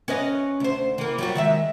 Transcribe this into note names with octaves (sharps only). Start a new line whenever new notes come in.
C#4 B4 D#5
D2 C5
E3 A#3
F#3 G3 F#4
D#3 G#3 E5